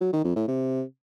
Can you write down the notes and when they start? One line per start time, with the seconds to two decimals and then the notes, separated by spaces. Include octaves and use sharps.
0.01 F#3
0.12 D#3
0.24 F2
0.36 A2
0.48 C3